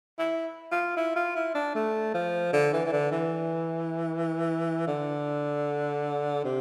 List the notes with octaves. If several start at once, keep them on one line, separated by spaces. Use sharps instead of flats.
E4
F4
E4
F4
E4
D4
A3
F3
D3
E3
E3
D3
E3
D3
C3